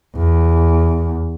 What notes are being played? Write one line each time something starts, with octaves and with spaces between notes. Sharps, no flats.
E2